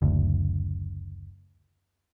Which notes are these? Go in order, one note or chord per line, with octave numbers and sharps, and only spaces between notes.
F#1 D2